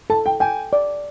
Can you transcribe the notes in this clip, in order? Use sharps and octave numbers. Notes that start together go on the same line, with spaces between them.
A4 A5
G5
G5 G#5
D5